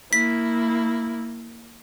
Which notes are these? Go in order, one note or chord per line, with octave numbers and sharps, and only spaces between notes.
A#3 E4 B6